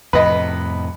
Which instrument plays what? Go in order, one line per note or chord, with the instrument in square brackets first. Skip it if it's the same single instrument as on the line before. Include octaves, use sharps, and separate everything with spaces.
[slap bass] F2 A2 C3 [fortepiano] B4 D#5